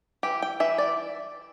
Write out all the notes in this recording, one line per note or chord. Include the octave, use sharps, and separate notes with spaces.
E3 G4
G5
E3 E5
D5